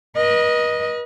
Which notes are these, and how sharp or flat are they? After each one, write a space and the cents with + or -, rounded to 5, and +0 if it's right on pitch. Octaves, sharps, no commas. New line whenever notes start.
B4 -40 D#5 +0